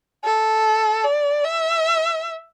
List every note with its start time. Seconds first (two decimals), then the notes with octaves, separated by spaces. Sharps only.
0.24 A4
1.04 D5
1.44 E5